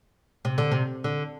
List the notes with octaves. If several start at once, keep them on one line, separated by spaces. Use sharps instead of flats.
C3
D3
C3
D3